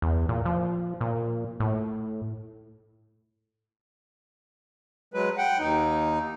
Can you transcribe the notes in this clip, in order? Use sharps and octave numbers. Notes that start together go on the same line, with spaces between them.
E2
A#2
F3
A#2
A2
F#3 G#3 B4
F#5 G5
D#2 D#4